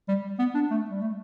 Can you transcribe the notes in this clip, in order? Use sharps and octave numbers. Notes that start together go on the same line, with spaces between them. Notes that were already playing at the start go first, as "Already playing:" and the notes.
G3
B3
D4
A3
G3
A3